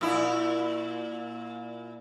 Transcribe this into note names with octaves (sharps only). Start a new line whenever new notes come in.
A#2 E4